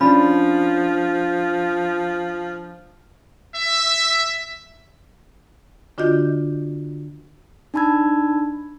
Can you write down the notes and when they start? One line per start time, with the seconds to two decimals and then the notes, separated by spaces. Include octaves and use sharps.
0.01 F3 C#4 D4 B5
3.56 E5
5.98 D3 D4 F4 F#4 D#5 G6
7.74 D4 D#4 A5 B5 E6 G#6